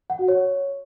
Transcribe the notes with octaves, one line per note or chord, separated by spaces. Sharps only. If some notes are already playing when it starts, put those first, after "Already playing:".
F#5
F#4
C#5